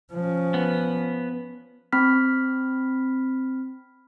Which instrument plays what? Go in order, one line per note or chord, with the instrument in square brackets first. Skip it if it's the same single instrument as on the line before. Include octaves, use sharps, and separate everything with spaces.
[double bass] F3 C#4
[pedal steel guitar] B3
[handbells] C4 B5 F6 B6